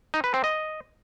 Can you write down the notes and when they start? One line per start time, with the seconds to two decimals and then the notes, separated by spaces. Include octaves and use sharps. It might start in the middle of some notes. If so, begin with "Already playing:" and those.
0.14 D#4
0.24 B4
0.34 C4
0.44 D#5